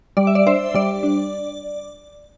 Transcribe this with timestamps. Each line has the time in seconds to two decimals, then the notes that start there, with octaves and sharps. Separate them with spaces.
0.17 G3 D5
0.27 E5
0.35 D5
0.47 D4 C5 E5
0.74 G3 D5
1.03 D4